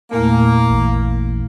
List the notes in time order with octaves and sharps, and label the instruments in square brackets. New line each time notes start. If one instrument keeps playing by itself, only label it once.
[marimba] E2 A#2 A3 [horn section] A#3
[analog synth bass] A1